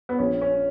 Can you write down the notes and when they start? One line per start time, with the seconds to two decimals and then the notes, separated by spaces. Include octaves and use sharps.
0.09 B3
0.19 A#1 C#4
0.42 C#4